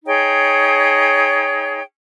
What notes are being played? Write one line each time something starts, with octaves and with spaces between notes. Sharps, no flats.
D#4 G#4 C#5 G5